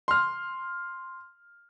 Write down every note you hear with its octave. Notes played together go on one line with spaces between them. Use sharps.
C6 F6